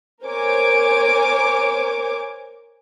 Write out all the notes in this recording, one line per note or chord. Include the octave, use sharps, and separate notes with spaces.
A#4 C5 C#5 G#5 D6